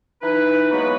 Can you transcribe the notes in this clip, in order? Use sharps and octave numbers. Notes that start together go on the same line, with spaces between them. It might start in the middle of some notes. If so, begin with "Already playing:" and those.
E3 D#4 B4
F#3 G#3 A#3 B3 F#4 B4